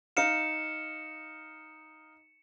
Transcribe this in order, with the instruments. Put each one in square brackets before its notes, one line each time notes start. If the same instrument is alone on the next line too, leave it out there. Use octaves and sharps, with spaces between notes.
[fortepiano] D#4 F5 [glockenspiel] C#7 E7